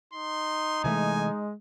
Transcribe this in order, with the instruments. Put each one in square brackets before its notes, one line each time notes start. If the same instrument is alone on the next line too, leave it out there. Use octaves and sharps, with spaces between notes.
[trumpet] D#4 [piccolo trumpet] C6
[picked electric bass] C3 E3 A3 [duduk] G#3 [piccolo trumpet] G#5